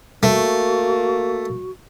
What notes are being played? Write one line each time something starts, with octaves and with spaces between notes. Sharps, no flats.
A3 A#3 F#4